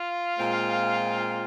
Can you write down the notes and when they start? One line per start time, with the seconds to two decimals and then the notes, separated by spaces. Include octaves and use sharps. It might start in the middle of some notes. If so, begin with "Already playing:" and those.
Already playing: F4 F5
0.39 A#2 G#3 C4